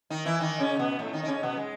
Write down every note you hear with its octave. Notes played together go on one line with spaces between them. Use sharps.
D#3 D#4
E3 E4
D#3 D#4
C#3 C#4
B2 B3
A2 A3
D#3 D#4
D#4
C#3 C#4
B2 B3
G#3